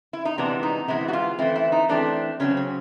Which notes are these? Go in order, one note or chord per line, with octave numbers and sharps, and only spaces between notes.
E4
D#4
C3 E3 G#3 B3 D4
D#4
C3 E3 G#3 B3 E4
F#4
F4
E3 A3 C4 E4
E4
D#4
E3 A3 C4 D4
C#3 F#3 A3 C4 C#4
C#4